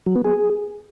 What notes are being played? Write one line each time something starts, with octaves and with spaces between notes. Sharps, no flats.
F#3
B3
G#4